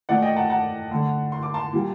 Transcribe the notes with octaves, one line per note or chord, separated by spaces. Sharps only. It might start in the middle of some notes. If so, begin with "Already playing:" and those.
A#2 A3 D5 F#5
D#5 G5
F#5 A5
F#5 A5
D3 A3
C6
D6
A5 C6
A#2 G3